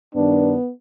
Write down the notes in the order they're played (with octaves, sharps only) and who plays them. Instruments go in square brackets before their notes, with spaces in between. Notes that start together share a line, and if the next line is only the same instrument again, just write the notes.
[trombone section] G2 D#3 D4 [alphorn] B3